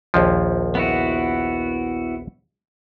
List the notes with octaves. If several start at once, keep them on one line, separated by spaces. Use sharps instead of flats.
A#1 D#2 F3
B3 E4 F#4